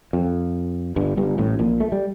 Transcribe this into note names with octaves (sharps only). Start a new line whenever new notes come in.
F2
G1 G2
G1 G2
A1 A2
A#1 A#2
A3
G3